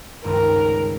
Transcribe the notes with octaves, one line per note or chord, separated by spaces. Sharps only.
G#1 C#2 G2 A#4